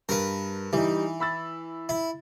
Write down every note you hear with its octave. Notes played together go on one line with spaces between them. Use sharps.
G2 A#4 B4
E3 G3 D#4
B5 E6 A6
E4